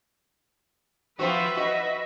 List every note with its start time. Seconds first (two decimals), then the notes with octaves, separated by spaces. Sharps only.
1.19 F3 C4 F#4 B4 E5
1.57 F#4 D#5